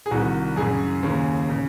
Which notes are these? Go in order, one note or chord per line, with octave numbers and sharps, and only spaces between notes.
G#4
C2 C3 D#3 F#4
F#2 C#3 G#4
D#2 C#3
C#3